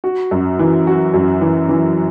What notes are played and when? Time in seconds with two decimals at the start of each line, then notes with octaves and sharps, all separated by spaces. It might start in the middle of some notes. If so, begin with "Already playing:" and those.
0.04 F#4
0.31 F#2
0.59 E3
0.87 F#4
1.14 F#2
1.41 E3
1.69 E3